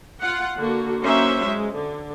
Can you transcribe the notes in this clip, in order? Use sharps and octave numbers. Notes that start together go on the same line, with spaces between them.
F4 F#5
D3 A#3 F#4
F#3 A#3 C#4 D#4 C5 E5
G#3
D3